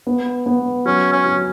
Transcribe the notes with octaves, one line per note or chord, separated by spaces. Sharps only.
B3
B3
F#3 C#4
C#4
F#3